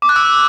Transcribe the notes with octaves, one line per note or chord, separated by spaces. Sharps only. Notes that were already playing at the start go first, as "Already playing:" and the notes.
D6
F#6
E6